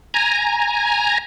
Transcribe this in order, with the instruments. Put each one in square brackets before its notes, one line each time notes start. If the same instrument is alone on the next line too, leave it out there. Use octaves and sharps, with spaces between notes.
[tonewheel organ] G#5 A#5